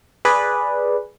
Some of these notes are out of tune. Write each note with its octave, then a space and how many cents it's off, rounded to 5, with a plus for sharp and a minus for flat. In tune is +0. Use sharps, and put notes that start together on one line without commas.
G#4 +0 B4 -5 D5 +0